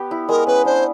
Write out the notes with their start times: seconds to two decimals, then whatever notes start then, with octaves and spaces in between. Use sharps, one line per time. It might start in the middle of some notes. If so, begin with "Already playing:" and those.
Already playing: B3 G4
0.11 E4
0.29 G#3 A#4
0.47 C#4 B4
0.65 D4 C5